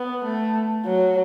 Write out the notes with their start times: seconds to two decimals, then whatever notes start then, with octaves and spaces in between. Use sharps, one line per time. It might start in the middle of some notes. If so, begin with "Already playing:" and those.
Already playing: B3
0.25 A3
0.85 F#3